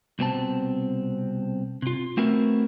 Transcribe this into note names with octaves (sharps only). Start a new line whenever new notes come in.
C2 B2 C4 A5
C3 F4
A3 B3 C4 E4 F#4 A#4